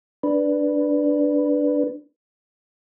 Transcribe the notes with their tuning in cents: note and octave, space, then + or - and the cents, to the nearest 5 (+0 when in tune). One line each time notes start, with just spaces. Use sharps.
D4 +0 B4 +0